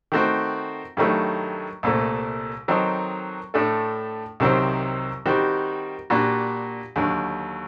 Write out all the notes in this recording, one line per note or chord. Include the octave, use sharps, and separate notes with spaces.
D#3 A3 C4 F#4
G2 D#3 F#3 A3
C2 A#2 A3
D#3 F#3 C4 D#4 A4
A2 A3 D4 A4
C2 C3 D#3 F#3 C4
D#3 G3 C4 F#4
A#2 G3 D4 F#4
D#2 D3 F#3